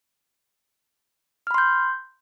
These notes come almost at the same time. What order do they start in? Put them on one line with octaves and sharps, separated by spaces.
F6 B5 C6 G6